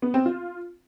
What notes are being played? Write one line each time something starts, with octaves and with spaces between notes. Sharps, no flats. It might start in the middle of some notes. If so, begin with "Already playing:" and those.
B3
C4
F4